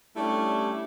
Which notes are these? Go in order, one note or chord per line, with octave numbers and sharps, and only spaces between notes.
G3 A3 C#4 D4 E4 G4